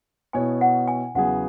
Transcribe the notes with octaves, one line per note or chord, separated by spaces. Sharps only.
B2 B3 E4 C#5 G#5
F#5
G#5
E2 C#3 F#3 B3 G#4 F#5